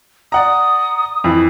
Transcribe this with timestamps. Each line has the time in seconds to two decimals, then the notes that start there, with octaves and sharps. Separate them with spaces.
0.32 D5 F#5 A#5 D#6
1.24 F2 E3 B5